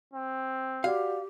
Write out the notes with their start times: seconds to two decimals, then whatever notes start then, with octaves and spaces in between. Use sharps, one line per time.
0.13 C4
0.84 F#4 G4 D5 F5 F#5